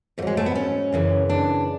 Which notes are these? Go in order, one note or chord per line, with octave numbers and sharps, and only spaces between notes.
G#2 F#3 G#3 A3
A3
B3
C#4
F#2 C#3 E3
D4